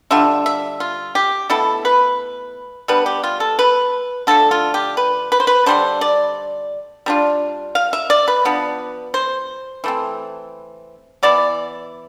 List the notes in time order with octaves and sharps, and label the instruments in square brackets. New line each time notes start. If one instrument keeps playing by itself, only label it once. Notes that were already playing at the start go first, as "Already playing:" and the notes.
[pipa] D3 G3 D4 F4 E5
E5
F4
G4
B2 A3 E4 A4
B4
G3 B3 D4 B4
G4
F4
A4
B4
D3 F3 A3 A4
F4
G4
B4
B4
C5
B4
D3 G3 D4 C5
D5
G3 D4 F4
F5
E5
D5
B4
F3 B3 D4
C5
E3 A3 C4
E3 B3 E4 D5